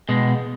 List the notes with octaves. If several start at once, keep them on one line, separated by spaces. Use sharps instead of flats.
B2 G#3